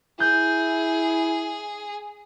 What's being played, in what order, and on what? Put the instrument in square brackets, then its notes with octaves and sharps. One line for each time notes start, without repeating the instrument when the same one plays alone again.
[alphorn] E4 [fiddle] G#4 [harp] G6